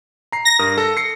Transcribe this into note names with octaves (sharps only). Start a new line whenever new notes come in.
A#5 C7
A#6
G2 A#4 D#6
A4
C7 C#7